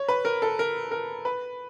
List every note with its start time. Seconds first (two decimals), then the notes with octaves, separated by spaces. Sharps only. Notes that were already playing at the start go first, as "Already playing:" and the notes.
Already playing: C#5
0.08 B4
0.25 A#4
0.42 A4
0.59 A#4
0.91 A#4
1.25 B4